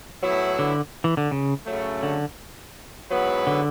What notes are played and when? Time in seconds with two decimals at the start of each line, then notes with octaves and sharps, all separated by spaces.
0.23 A2 F#3 B3 E4
0.59 D3
1.04 E3
1.17 D3
1.31 C#3
1.66 F#2 C#3 F#3 A3
2.03 D3
3.11 G#2 F#3 B3 E4 B4
3.47 D3